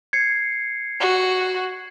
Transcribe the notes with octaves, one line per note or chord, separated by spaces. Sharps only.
G#6 C7 C#7
F#4